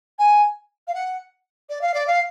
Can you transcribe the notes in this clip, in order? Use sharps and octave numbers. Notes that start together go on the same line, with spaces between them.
G#5
F5
F#5
D5
F5
D5
F5